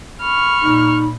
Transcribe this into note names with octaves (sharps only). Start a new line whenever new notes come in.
B5 C#6 F6
A#2 D#4